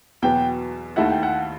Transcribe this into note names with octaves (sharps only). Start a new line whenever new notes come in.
E2 B2 F#3 B3 G5
D#2 D#3 A3 E4 F#5
G5
F#5